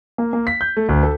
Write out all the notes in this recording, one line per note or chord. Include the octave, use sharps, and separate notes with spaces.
A#3
A#3
B6
G6
A3
D2
A4